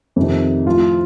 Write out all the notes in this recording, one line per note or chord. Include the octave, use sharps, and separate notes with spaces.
F2 C3 D#3
A2 F3 F4